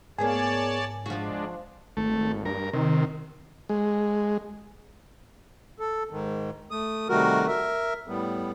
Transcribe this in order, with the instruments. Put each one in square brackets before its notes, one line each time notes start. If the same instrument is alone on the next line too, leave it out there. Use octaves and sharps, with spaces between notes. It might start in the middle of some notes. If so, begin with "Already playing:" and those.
[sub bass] G#2 [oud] A#3 B3 G#4 [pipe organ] C#5 D5 A5 [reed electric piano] G#5
[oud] F3 F#4 [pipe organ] G#3 D4
[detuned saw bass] G#1 [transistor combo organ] A3
[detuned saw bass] G2 [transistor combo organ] A#4
[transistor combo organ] C3 [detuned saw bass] D#3
[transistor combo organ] G#3
[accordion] A4
G#2 D#3
A3 D#6
C3 D#3 G3 A3 F#4 A#4
A#4 E5
A2 G3 B3